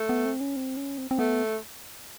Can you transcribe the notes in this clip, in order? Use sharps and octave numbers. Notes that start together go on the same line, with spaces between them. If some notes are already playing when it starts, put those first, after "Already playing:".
Already playing: A3
B3
C4
C#4
C4
C#4
C4
C4
A3 B3